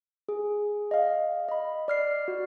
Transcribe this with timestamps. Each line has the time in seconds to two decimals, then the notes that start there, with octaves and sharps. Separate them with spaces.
0.29 G#4
0.91 D#5 F5
1.48 D#5 B5
1.88 D5 F6 C7
2.28 F#4